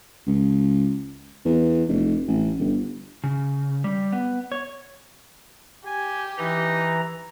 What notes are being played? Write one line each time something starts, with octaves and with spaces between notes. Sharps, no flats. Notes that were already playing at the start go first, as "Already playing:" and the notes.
C#2
E2
F1
A1
G1
C#3
G3
B3
C#5
G4 G#5
E3 D#4 A#5